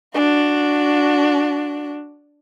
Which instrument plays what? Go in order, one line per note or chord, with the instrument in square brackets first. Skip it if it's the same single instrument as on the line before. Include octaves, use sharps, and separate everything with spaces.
[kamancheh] D4 F#4